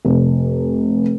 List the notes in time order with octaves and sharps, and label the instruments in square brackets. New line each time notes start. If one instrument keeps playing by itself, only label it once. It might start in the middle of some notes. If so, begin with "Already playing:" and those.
[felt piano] F1